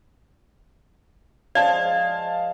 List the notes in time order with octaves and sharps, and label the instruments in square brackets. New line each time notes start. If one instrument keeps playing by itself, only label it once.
[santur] F3 G#3 D#5 [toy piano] D5 [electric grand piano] F5 A5